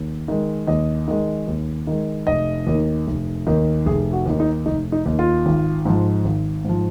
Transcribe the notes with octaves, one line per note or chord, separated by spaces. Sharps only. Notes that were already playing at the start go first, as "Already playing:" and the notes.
Already playing: D#2
D#3 G#3
D#2 D#5
D#3 G#3
D#2
D#3 G#3
F1 D#5
D#2 D#3
F1
D#2 D#3
F1 G#4
F#4
D#2 D#3
D#4
F1 D#4
D#4
D#2 D#3
F4
G#1
G#2 F3
G#1
G#2 F3